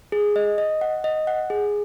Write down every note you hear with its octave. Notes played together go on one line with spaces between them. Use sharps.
G#4
D#5
D#5
F#5
D#5
F#5
G#4